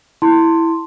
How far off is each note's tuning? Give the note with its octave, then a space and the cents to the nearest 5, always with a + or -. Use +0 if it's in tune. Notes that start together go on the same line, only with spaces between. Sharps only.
E4 +0 A5 +35 C6 +0